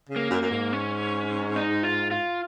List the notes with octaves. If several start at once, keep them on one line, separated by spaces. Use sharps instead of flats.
C#3
A#3
F#2
F#2 A#3
G#2
C#4
D#4
F4
F4